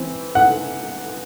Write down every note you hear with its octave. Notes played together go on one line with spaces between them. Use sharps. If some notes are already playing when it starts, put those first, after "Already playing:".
Already playing: E3 C4
F#5